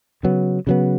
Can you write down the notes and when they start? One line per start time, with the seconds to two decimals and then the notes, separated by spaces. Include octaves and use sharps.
0.23 C#3 F#3 B3
0.67 C#3 F#3 B3